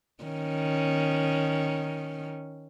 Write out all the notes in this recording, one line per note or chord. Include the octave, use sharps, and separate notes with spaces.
D#3 C#4